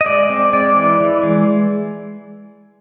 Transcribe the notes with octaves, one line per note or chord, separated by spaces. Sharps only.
D#5
G#3 D5
C4
G#3 D5
E3
E3
G#3